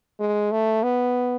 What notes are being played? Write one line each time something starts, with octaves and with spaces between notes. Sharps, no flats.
G#3
A3
B3